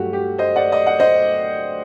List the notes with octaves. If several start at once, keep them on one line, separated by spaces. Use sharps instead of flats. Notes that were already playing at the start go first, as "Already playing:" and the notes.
Already playing: G2 F#3 A3 F#4 G4
G4
C5 D#5
D5 F#5
D#5
F#5
C5 D#5